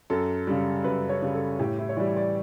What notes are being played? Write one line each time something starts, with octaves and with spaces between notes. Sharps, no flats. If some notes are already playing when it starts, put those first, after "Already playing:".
F#2 A4
C#3 G3
F#2 B4
C#5
C#3 G3
A4
A2 G4
E4
C#5
E3 G3 D5
D5